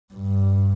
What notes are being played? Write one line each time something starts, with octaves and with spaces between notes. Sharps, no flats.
G2